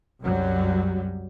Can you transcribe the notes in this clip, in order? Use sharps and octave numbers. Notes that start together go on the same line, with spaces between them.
C2 F#2 F#3 G3